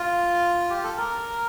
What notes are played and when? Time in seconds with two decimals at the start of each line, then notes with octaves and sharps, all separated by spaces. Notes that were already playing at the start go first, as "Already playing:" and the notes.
Already playing: F4
0.70 G4
0.83 A4
0.97 A#4